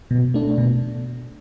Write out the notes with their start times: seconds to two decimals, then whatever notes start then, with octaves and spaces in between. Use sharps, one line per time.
0.11 B2
0.34 A3 D4
0.58 B2